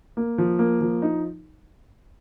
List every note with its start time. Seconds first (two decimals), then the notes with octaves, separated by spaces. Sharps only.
0.17 A#3
0.38 F3
0.59 A#3
0.81 F3
1.02 D#4